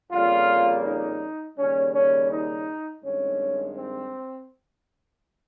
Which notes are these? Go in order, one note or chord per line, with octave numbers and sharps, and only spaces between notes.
F2 C#3 G3 A#3 F4
D#4
D#2 C#3 G3 C#4
C#4
D#4
G2 D#3 G#3 C4 C#4
C4